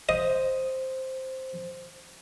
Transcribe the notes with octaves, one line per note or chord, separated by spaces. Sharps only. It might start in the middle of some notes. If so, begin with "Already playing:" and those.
C5 D#5